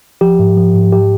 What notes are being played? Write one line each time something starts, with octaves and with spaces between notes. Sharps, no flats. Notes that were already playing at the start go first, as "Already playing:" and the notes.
F3 G4
G#2
F3
G#2
G4